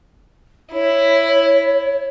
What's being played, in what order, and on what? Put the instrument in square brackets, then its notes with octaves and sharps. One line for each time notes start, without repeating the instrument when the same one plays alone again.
[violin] E4 [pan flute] C#5